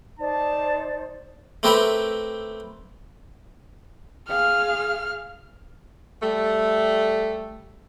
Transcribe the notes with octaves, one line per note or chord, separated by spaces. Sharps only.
D#4 C5 D5 A5
A3 C4 G4 A#4 B4 E5
G#4 F5 F6
G3 A3